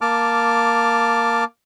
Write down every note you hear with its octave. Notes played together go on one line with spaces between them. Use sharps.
A#3 A5 D6 F6